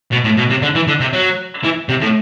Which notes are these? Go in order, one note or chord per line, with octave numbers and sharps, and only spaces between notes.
B2
A2
B2
C3
D3
E3
D3
C3
F#3
E3
C3
A2